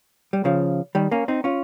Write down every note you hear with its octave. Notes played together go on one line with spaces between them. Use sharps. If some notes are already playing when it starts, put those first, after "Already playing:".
G3
C#3 F3
D#3 G3
A#3 C#4
C4 D#4
C#4 F4